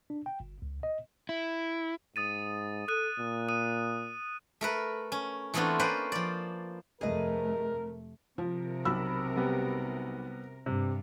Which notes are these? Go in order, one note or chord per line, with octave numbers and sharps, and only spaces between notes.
D4
G5
G1
C#2
D#5
E4
G#2 D#6 A6 D#7
A4 D#6 F#6 D#7
A#2
D#6 D#7
A3 A#4 B4
C#4
E3 A3 B3 C4 D4 F4
A#3 C#4 B4 C5 D5
F3 D5
F2 C3 A3 G#4 A#4 B4 D#5
C3 F3 A#4
B1 B5 E6
G3 B3 G4
G2 C3